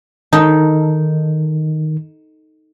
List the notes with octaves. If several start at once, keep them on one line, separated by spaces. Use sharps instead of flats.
D#3 D#4 A4